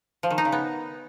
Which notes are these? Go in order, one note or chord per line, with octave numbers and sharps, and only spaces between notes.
F3
D#3
D#4
C#3
B3